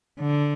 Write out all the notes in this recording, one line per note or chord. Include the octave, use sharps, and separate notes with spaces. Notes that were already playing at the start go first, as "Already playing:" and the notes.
D3